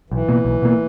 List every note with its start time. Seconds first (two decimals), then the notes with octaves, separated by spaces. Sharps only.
0.10 B1 E3
0.28 B2 A#3
0.45 B1
0.62 B2 A#3